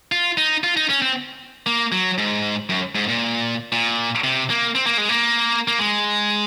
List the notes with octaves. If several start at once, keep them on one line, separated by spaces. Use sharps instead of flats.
F4
D#4
F4
D#4
C#4
C4
A#3
F#3
G#2
F#2
G#2
A#2
A#2
C3
A#3
C4
A#3
G#3
A#3
A#3
G#3